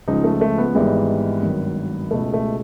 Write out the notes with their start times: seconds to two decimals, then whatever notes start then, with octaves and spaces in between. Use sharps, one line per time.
0.08 C#2 C#3 F3 D#4
0.24 A3
0.41 A3
0.58 B3
0.75 G#1 G#2 E3 G3
1.43 G#1 G2 D#3 F#3
2.11 C#2 B2 G#3 A3
2.33 A3